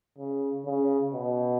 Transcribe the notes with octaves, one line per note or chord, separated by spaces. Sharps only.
C#3
C#3
B2